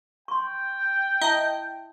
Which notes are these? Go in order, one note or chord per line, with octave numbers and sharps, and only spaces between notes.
G5 C6 C#6
E4 D#5 E5 A5